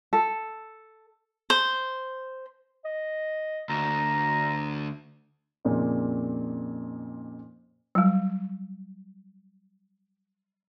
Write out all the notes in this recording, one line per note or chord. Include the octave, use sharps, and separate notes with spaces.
A4
C5
D#5
D2 A#5
F2 A#2 C#3 A#3 C4 D#4
F#3 G3